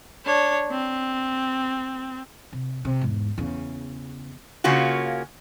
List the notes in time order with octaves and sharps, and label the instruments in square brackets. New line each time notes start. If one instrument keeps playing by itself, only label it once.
[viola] D4 C#5
C4
[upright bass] C3
C3
E2 G#2
E2 C#3
[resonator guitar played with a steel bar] C#3 A#3 C#4 F4 F#4